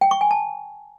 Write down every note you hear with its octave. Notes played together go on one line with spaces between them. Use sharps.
G5
C#6
G#5
A5